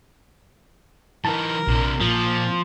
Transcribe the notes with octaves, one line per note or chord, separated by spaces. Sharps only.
E3 D#4 A#4 A5
A#1 C3 D4
A#2 F3